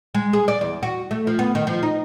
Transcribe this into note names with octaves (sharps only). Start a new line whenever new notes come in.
G#3
G#4
D5
E2
F#4
A3
F3
B3
D#3
F3
D#4